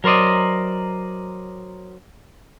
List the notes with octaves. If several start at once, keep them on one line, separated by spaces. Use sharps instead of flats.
F#3 A#4 C5 D5 D#5